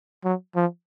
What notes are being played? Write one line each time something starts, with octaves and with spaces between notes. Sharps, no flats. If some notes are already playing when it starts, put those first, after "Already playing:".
F#3
F3